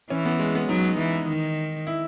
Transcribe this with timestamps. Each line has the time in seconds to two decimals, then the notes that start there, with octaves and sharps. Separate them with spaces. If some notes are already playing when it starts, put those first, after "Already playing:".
0.10 E3 C#4
0.26 B3
0.40 G#3
0.55 B3
0.69 F#3 D#4
0.98 E3
1.28 D#3
1.87 E4